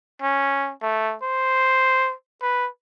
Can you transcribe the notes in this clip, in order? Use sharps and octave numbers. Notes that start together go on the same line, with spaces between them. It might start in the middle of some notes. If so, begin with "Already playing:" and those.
C#4
A3
C5
B4